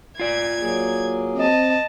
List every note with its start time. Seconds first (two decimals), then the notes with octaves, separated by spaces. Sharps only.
0.20 F4 D5 G#6
0.61 F#3 A#3 G#4
1.37 C4 D#5 A5